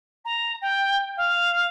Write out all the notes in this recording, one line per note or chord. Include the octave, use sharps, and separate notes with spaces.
A#5
G5
F5